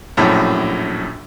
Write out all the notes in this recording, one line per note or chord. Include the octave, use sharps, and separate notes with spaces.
A#1 F#2 A2